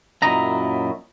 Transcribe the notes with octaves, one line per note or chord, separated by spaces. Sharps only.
F#2 A#2 F#3 E4 D#5 A#5